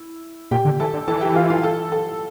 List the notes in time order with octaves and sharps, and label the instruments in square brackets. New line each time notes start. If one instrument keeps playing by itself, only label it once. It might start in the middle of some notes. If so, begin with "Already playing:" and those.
Already playing: [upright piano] E4
[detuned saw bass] A#2 [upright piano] G4 G5
[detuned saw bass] D3
[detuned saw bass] E3 [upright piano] A4 A5
[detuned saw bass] D3
[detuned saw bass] E3 [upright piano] A4 A5
[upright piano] G4 G5
F4 F5
F4 F5
A4 A5
A4 A5